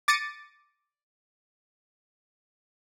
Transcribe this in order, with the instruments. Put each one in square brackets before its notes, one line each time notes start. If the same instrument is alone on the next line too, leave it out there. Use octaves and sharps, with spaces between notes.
[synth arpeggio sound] D6 A6 A#6 C#7 D#7